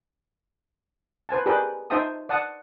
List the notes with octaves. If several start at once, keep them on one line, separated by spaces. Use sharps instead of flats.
B4 C5 G#5 A5
G4 G#4 A#4 B4 D5 G5
D#4 C5 E5 G5 A5 D#6
D5 F#5 A5 D#6